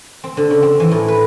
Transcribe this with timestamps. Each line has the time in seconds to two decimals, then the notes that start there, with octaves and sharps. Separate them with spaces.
0.24 C4
0.37 D3
0.50 C#3
0.63 C4
0.80 E3
0.91 A2
1.08 B4